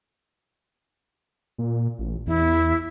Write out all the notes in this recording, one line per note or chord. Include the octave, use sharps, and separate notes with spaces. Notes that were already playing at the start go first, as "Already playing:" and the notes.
A#2
A1
E2 E4